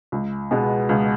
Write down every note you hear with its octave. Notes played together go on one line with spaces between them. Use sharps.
C#2
B2 G#3 B3
C#2